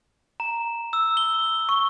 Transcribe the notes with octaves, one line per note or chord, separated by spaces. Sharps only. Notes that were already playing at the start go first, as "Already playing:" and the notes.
A#5
E6
G7
C#6